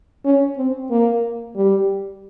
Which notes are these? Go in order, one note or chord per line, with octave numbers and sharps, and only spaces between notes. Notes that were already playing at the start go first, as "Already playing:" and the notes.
C#4
C4
A#3
G3